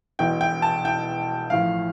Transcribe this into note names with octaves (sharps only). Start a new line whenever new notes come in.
E1 E2 B2 G5
G5
A5
G5
A1 A2 F3 F5